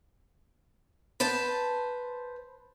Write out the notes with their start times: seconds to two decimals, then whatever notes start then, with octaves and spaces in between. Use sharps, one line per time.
1.20 B4 C5 A5